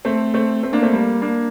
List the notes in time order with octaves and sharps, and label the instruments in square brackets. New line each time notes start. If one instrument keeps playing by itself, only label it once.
[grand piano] A3 C4
A3 C4
A3 C4
A#3 D4
A3 C4
G3 A#3
A#3 D4